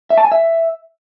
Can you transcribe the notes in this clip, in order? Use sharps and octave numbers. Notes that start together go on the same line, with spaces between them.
E5
A5
G#5
E5